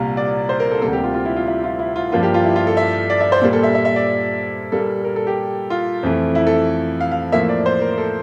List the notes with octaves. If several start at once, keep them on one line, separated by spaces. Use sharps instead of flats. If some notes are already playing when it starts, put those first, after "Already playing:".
Already playing: C2 A#2 G3 F5
D5
C5
A#4
A4
D2 C3 G3 A#3 A4
G4
F4
F4
E4
F4
E4
F4
E4
F4
G2 F3 A#3 F4
G4
F4
E4
F4
A4
E5
D5
E5
C5
A#2 G3 A#3
A4
E5
E5
E5
D5
A#2 G3 A#3 A4
A#4
A4
G4
F4
F2 E3 A3
E4
A4
F5
F5
A2 F3 A#3 E5
D5
C5
A#4
A4